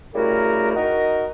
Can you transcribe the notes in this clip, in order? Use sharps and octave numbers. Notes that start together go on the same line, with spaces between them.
C#3 G3 A3 E4 F#4 A#4
D#4 F#4 A#4 D#5